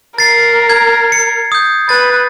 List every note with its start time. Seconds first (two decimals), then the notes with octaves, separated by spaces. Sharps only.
0.18 A#4 A6 C7
0.69 G#6
1.12 C#7
1.52 D#6 G6
1.89 B4 A6